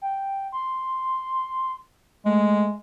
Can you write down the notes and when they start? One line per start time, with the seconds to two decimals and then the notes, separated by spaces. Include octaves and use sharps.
0.02 G5
0.52 C6
2.25 G#3 A3